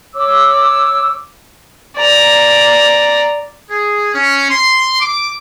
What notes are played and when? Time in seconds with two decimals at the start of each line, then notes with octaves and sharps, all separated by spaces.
0.15 C#5 D6 E6
1.97 D5 A#5
3.71 G#4
4.14 C#4
4.49 C6
5.00 D6